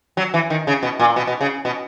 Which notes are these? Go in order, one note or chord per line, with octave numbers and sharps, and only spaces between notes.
F#3
E3
D#3
C#3
B2
A#2
B2
B2
C#3
B2